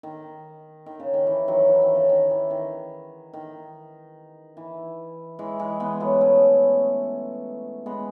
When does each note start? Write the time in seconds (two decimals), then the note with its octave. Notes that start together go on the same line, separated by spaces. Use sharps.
0.03 D#3
0.86 D#3
1.00 C#3
1.14 D#3
1.27 E3
1.48 D#3 F#3
1.68 E3
1.82 D#3
1.95 C#3
2.09 D#3
2.31 E3
2.51 D#3
3.33 D#3
4.57 E3
5.39 E3 G#3
5.59 E3 G#3
5.80 G#3 B3
6.00 F#3 A3
6.21 A3 C#4
7.86 G#3 B3